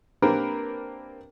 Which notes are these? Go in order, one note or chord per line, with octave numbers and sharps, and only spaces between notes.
A#3 C4 D4 G4 A#4 B4